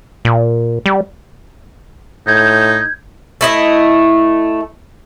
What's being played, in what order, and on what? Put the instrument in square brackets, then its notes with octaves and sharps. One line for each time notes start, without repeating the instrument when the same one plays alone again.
[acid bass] A#2
G3
[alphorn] A2 [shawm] D#4 [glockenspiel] G6 G#6
[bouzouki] A3 E4 D#5